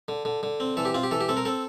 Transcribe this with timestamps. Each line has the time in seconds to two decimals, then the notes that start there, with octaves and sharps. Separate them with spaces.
0.08 D3
0.25 D3
0.43 D3
0.60 C4
0.77 E3 A4
0.85 G4
0.94 C4 F4
1.03 G4
1.11 E3 A4
1.21 G4
1.29 C4 A4
1.37 A#4
1.45 C4 A4